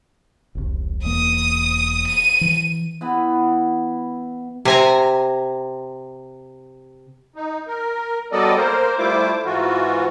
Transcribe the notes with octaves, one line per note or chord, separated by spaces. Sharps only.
E1 C2
E1 E2 A#3 D#6
D#7
E3
E3 B3 B5
C3 G#5 A#5
D#4
A#4
F#3 G3 B3 A4 D5 D#5
A#3 A#4 C5
G3 A3 E4 F4 C5 D6
G#2 E3 F4 F#4